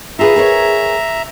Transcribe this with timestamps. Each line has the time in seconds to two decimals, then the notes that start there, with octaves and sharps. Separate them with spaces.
0.19 F4 G#4 B4 E5 A#5
0.36 G#4 A#4 C#5